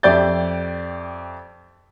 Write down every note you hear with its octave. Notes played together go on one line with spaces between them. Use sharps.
F2 G4 D5 E5 G6 A6